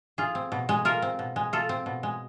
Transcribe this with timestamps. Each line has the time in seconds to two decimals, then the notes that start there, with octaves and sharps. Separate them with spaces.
0.18 F4 G#4
0.35 C4
0.52 B2
0.69 G#3
0.85 F4 A#4
1.02 C4
1.19 B2
1.36 G#3
1.53 F4 A4
1.69 C4
1.86 B2
2.03 G#3